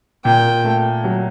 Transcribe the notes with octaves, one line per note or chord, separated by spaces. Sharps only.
A#2 G5
A3
F#3